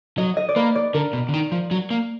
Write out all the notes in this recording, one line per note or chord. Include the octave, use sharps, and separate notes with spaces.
F#3 D#5
D#5
D5
A#3 B4
D5
D3 A#4
B2
D3
D#3
F3
F#3
A#3